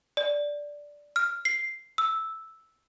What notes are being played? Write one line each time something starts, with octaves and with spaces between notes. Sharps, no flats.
D5
F6
C7
E6